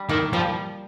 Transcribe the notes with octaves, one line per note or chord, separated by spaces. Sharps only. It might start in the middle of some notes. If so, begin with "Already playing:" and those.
Already playing: G3
D#3 A#3
F3 G3